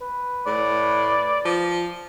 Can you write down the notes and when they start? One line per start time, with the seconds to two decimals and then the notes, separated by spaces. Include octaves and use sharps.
0.01 B4
0.47 A2 D5
1.45 F3